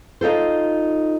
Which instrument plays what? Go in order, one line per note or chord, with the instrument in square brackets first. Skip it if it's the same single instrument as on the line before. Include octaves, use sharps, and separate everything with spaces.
[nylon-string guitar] D#4 F4 A4 C5